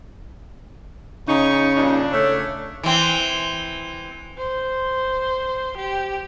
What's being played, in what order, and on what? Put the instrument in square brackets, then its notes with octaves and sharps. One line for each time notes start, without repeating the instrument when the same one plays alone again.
[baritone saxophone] C#3 [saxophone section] D#4 [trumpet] C#6
[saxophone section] G2 A#2 D#4 [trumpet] D4
[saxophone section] A3 C#5
[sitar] E3 C4
[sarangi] C5
G4